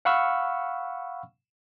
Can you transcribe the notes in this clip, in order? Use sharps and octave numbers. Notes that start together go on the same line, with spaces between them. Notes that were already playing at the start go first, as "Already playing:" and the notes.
F5 F#5 B5 C#6 E6 F6